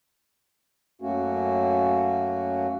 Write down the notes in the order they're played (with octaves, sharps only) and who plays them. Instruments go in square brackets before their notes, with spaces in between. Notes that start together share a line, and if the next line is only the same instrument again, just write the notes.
[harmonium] F#2 A3 A#3 C#4 F#4